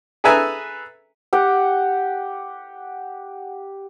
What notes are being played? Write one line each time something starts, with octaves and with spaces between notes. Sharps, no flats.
G#4 A4 B4 E5 G#5 A#5
G4 F#5 G5